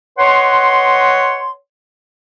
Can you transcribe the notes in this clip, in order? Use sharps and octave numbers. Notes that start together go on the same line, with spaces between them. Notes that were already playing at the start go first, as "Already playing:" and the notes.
B4 C#5 D#5 F#5 C6